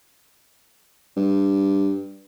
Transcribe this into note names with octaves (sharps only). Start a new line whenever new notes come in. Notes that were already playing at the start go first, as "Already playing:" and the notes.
G2